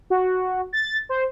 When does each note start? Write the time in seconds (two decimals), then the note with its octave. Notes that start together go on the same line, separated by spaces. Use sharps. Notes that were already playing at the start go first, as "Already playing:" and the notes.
0.10 F#4
0.73 A6
1.09 C5